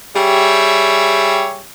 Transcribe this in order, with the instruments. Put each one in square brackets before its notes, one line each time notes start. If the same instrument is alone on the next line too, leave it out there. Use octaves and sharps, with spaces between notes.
[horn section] G3 G4 G#4 C#5 E5